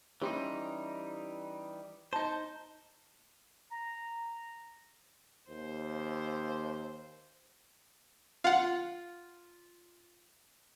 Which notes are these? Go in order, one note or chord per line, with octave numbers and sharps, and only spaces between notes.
E3 G3 C#4 D#4 G4 C6
D#4 C5 A5
A#5
D#2 C5
F4 F5 F#5